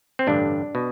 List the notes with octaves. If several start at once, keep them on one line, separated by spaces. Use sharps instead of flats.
C4
A1 G2 D3 D4
B2